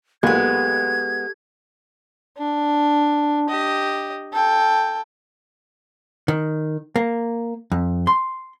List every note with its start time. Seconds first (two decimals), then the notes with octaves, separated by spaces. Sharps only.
0.23 B1 A#2 G#3 B3 G4 A4 F5 G#6
2.38 D4
3.49 G4 D#5
4.33 A4 G5
6.28 D#3
6.96 A#3
7.72 F2
8.07 C6